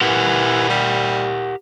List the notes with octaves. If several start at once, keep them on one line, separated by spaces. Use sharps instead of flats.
E3 G4 A#4 F#5
G3